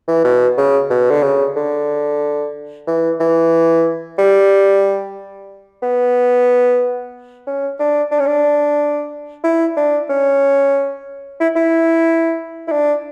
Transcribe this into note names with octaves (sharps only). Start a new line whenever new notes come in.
E3
B2
C#3
B2
D3
C#3
D3
E3
E3
G3
B3
C#4
D4
D4
C#4
D4
E4
D4
C#4
E4
E4
E4
D4